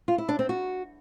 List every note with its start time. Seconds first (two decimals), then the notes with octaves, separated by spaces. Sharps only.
0.08 F4
0.18 E4
0.29 D4
0.39 C4
0.49 F#4